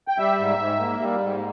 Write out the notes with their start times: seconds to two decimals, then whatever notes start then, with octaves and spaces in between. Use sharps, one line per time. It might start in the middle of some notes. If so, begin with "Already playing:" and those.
0.08 G5
0.18 G3 E5
0.39 G#2
0.59 G#2
0.80 A#3
1.00 G3
1.20 G#2